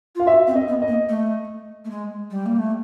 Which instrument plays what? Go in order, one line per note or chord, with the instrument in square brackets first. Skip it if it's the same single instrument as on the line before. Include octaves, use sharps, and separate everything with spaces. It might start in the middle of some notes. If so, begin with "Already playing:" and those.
[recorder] F4 [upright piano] F5
[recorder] F#4 [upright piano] E5
[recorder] C4
[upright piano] D#5
[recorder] B3
[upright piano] D#5
[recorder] A#3
A3
A3
G#3
G3
A#3
A3